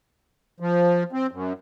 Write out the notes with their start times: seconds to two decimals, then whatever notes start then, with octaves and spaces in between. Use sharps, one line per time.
0.60 F3
1.12 C4
1.31 F#2